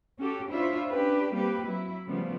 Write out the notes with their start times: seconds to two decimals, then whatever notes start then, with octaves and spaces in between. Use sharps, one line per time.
0.18 C#4 F#4 G4 A4
0.49 D4 E4 F4 C5 C#5 E5
0.88 C#4 D4 G4 B4
1.33 G3 A#3 C4 G4 B4
1.66 F#3 E4
2.07 C#3 F3 G3 A3 B3